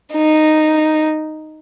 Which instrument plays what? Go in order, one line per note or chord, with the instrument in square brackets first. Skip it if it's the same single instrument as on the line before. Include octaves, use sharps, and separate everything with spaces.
[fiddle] D#4